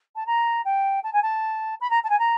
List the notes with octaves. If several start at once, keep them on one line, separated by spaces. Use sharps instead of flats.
A5
A#5
G5
A5
G#5
A5
B5
A#5
A5
G#5
A#5